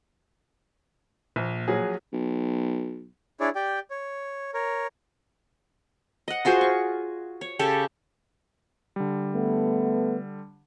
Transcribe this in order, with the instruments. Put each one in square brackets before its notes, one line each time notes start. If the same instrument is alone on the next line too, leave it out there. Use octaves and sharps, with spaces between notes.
[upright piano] A#1 [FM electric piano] A#2
[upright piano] A#1 F#3 G#4
[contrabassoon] B1
[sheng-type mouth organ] D4 E4 G#4 C#5 D5
G4 D5 G5
C#5
A#4 C#5
[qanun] D#5 F#5
F4 F#4 G#4 C5
C#6
C#5
C#3 G4 A4
[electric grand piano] D3 G3
[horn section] A3 B3